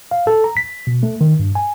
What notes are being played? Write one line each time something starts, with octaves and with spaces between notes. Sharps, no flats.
F5
A4
A#5
B6
B2
A3
D#3
G2
G#5